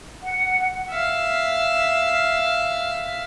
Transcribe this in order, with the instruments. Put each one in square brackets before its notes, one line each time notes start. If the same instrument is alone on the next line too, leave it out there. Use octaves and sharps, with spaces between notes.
[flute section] F#5
[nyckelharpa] E5 F5